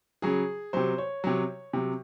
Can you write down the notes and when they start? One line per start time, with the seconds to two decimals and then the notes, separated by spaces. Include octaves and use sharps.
0.22 C#3 F#3 G#4
0.73 C3 F#3 C5
0.98 C#5
1.24 C3 F#3
1.73 C3 F#3